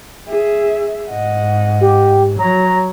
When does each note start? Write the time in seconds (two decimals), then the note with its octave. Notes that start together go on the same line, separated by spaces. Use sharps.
0.28 G#4 E5
1.10 G#2 D#5 F#5
1.81 G4
2.39 F#3 C#5 A#5